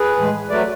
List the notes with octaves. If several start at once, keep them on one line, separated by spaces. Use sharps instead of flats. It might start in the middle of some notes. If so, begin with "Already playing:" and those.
Already playing: G#4 B4
A2 E3 G#3
F#3 A3 B4 D5